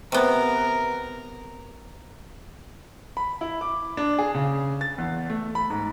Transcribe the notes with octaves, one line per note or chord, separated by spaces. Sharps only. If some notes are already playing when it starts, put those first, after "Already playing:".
C3 B3 A#4
B5
E4
D6
D4
G#4
C#3
A6
E2
A3
B5
G#2